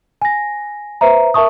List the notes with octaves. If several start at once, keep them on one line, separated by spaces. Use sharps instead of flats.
G#5 A#6
B4 C5 E5 A#5
A#4 E5 A5 C#6 D#6